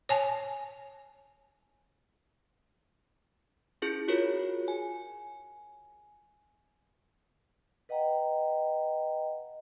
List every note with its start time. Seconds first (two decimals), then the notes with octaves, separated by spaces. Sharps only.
0.09 C#5 G#5 A5
3.82 C#4 E4 G#4 G6 C#7 D7
4.08 F4 F#4 G#4 A#4 C#5
4.68 G#5
7.89 B4 D#5 F#5 G5 A#5